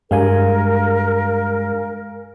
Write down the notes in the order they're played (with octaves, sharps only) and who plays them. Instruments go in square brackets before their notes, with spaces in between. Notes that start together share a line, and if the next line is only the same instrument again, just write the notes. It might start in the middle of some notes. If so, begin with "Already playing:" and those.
[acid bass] G2 [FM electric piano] G#3 F5 G#5 [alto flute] A#4